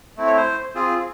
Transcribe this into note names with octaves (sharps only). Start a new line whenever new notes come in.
A3 C4 E4
C#5
C5
C4 F4 G#4